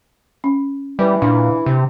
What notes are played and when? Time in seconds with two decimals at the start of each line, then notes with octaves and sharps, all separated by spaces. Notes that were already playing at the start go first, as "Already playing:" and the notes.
0.44 C#4
0.99 E3 G3
1.22 A#2 D4
1.66 C3